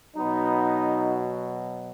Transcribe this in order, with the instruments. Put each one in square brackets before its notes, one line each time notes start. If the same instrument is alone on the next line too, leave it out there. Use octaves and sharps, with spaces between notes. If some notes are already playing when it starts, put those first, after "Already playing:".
[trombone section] B2 F#3 B3 D#4